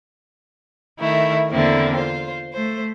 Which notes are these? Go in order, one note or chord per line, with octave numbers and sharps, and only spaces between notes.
D#3 A3 E4
E2 D3 A#3 C4 E4
F4 C5
A3 C5